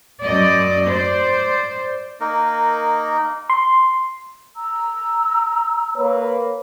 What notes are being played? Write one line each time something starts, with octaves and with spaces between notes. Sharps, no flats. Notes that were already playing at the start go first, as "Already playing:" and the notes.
F#2 D5 D#5
C5 D5
A#3 D#4 A#4
C6
A#5 E6
A#3 B4 C#5